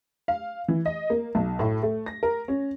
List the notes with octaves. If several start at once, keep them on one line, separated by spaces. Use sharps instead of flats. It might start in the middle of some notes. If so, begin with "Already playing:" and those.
F5
E3
D#5
A#3
B1
A2
A3
A#6
A#4
C#4